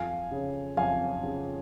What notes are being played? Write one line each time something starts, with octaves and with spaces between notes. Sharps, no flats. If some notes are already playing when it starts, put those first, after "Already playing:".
Already playing: F2 F5 G#5
C#3
F2 F5 G#5
C#3